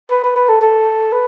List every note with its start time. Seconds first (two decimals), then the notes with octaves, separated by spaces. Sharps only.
0.11 B4
0.23 B4
0.36 B4
0.48 A4
0.61 A4
1.12 B4